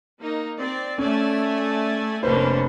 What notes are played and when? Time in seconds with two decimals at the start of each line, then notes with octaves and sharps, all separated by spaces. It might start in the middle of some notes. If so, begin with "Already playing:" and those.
0.18 A#3 D#4
0.58 C4 D5
0.98 A3 C#4 D5 G#5
2.23 F1 A#3 C#4 D4 B4 C5